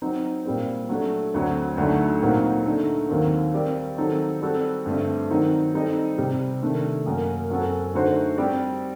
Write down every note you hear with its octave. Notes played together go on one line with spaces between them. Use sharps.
F#3 C4 D#4
A#2 G3 C4
F#3 A3 D4
D2 D3 F#3 C4
D2 D3 F#3 A3 D#4
A#2 F#3 C4 D#4
D3 A3 D#4
D#2 D#3 F#3 C4
G3 C4 G4 A#4 D5
D#3 F#3 C4 D#4 A4
G3 C4 F#4 A4
G2 D3 A3 C4
D#3 F#3 C4 D#4
G3 C4 D#4 A4 D#5
C3 G3 C4
C3 D#3 A3 D4 A4
F#2 F#3 A#3
F#2 F#3 C4 F#4 A4
D3 A3 D#4 F#4 C5
G3 C4 G4 D5